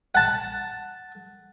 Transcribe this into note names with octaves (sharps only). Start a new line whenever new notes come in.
F#5 A5